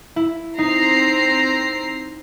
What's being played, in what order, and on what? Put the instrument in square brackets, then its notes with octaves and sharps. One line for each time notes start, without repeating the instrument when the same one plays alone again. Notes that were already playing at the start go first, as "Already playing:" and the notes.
[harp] E4
[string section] C4 A#5 C7 [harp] D#4